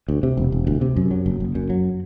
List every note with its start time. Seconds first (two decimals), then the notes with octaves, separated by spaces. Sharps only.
0.08 D2
0.23 C3
0.37 E1
0.52 E1
0.67 D2
0.81 C3
0.96 F#2
1.11 F#3
1.26 F#1
1.40 F#1
1.55 F#2
1.70 F#3